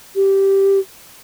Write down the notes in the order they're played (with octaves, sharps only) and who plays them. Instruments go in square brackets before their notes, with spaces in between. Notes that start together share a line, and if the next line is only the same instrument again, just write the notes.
[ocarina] G4